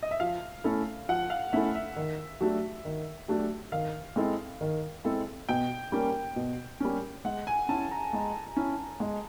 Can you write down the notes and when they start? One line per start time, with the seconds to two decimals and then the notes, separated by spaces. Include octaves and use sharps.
0.03 D#5
0.11 E5
0.20 F3 F5
0.64 A3 C#4 E4 A4
1.09 F3 F#5
1.30 F5
1.53 A3 C#4 E4 A4 E5
1.75 E5
1.96 D#3
2.41 F#3 A3 D4 G4
2.85 D#3
3.28 F#3 A3 D4 G4
3.72 D#3 F5
4.16 G#3 C4 E4 A4
4.61 D#3
5.04 G#3 C4 E4 A4
5.49 B2 G5
5.92 G3 A#3 C#4
6.36 B2
6.80 G3 A#3 C#4
7.25 G#3 F#5
7.47 G#5
7.69 C#4 E4 A5
7.91 A#5
8.13 G#3
8.56 C#4 E4
9.00 G#3